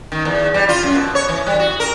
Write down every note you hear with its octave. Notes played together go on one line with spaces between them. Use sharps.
D#3
E2
G3
F4
F#2
B2
C#5
E3
G3
F#4
A#4